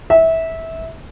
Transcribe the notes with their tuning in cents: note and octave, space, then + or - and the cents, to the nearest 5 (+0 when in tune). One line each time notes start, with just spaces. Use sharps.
E5 -20